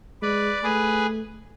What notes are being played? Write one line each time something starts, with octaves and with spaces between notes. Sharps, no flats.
G#3 B4 D5
A3 G#4 B4